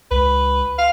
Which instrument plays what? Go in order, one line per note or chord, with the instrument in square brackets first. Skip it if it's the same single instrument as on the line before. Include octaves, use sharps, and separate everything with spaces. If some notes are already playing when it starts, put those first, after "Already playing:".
[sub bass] C#2 [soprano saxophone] B4
[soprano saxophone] F5